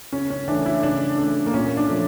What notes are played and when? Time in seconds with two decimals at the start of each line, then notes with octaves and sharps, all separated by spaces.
0.12 C#3 C#4
0.30 C#4
0.48 E3 A3 D4
0.66 E4
0.83 C#3 D4
1.18 E3 A3 D4
1.46 A#3
1.54 A#2 C#4
1.77 D4
1.89 F3 A3